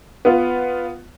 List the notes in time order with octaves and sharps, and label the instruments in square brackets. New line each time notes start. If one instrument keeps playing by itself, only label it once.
[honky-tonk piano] B3 F4